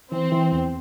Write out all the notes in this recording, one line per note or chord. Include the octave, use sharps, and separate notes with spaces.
E3 C4
E3
E2